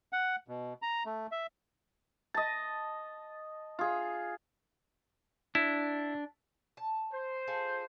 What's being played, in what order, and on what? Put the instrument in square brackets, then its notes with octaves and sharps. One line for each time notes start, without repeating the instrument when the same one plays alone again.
[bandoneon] F#5
B2
A#5
A3
E5
[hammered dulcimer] D#5 A5
F4 G#4
[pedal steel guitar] D4 [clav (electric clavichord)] E4
[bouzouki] A5
[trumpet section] C5
[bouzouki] F4 G#4 A4